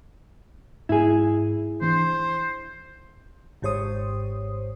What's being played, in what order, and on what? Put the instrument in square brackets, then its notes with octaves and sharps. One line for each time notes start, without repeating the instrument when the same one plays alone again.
[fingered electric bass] G#2 [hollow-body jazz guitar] E4 G#4
[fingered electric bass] E3 C#4 D4 [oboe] C5
[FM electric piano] G#1 G#2 G4 C5 C#5 D#6